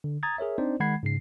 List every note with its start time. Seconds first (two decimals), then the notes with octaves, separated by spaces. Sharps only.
0.04 D3
0.23 A#5 D#6 G#6 A6
0.38 G#4 A#4 C#5 E5
0.58 C4 D4 D#4 C5 D5
0.80 D#3 G#3 F#5 B5 G#6 C7
1.03 G#2 C#3 C7